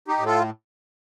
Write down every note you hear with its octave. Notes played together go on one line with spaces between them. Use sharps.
D#4 G4
A2
F4 A4